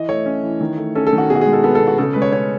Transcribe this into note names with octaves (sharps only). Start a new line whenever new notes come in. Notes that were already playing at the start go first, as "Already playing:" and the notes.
Already playing: E3 D#5
A3 C#5
C#4
E3
D#3
A3
C#4 A4
A4
D#3
F#4
B2 G#4
F#4
G#3 G#4
A4
B3 A4
A4
B2
F#4
C#3 A4
G#3 B4
C#5
C#4 C#5